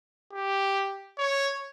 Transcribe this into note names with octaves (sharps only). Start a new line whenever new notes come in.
G4
C#5